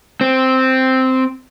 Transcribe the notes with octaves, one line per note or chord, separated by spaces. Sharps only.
C4